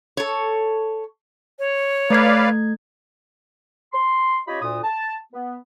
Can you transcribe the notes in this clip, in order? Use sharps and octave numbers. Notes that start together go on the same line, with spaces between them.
A4 C#5
C#5
A3 B4 D5 F5 G#6
C6
C#4 F4 G4 C#5 D#5 B5
D2 A#2 D#6
A5
B3